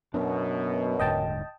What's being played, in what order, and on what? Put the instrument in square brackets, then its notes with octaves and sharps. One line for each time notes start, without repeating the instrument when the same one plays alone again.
[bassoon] F#2 [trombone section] B2 [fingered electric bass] F#3 B3 D4
[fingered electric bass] D#1 G#2 D3 [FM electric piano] D#5 G5 A5